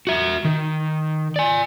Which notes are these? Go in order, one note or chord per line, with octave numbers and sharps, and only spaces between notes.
F#4 E5
D#3
D5 G#5